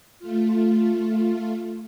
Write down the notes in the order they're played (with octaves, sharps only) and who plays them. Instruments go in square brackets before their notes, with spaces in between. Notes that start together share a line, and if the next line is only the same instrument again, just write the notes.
[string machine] A3 F4